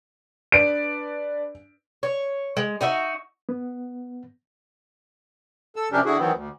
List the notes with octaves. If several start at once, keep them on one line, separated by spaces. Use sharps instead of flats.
D4 B4 D5 D7
C#5
G#3
D#4 F#4 E5
B3
A4 E6
C3 F3 C#4 D4 G4 A#4
D3 E4 F#4 G#4
D#3 E3 F#3 B3 C4
D2